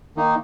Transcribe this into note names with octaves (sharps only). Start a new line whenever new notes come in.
D#3 A#3 D#4